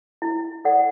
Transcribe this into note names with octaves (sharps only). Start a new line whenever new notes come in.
E4
A4 D5 F#5